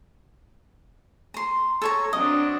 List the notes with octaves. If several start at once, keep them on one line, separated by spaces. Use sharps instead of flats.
A#5 C6
A4 C#5 A#5
F#3 C4 D4 D#5